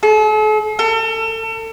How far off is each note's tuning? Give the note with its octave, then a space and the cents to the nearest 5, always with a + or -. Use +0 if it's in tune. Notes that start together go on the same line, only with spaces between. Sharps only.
A4 -45
A4 +35